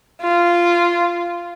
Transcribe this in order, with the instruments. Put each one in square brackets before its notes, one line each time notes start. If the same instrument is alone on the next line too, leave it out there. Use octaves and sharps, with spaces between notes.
[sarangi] F4